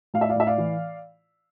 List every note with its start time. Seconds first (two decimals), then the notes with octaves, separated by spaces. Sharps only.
0.14 A2 F5
0.21 E5
0.29 D5 F5
0.36 A2 E5
0.47 D5 F5
0.58 E3